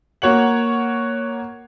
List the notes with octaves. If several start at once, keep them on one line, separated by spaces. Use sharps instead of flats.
A#3 F#4 C#5 F#5 F#7